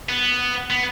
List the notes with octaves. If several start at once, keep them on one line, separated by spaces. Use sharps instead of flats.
B3
B3